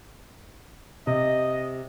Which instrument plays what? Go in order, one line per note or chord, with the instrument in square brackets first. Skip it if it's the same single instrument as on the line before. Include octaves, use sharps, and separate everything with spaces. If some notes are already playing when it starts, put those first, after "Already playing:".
[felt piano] C3 [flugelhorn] D#5